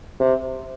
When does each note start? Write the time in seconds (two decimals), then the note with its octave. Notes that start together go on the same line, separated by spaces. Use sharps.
0.20 C3